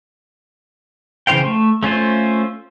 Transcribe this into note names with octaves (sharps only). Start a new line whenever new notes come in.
C#3 E3 C5 F5 G5
A3
A3 C#4 F4 C5